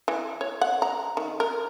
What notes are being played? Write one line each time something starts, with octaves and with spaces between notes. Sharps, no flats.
E3
C#5
F#5
A#5
D#3
A#4